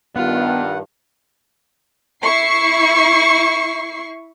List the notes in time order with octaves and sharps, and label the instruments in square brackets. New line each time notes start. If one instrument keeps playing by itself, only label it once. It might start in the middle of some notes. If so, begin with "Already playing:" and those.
[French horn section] G2 D#3 [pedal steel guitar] B3 [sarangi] F4 [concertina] F#5
[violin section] E4 C#6 C7